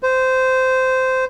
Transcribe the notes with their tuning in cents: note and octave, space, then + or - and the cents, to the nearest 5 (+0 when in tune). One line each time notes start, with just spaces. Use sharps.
C5 -15